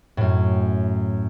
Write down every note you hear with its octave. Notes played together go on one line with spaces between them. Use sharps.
F#2 A2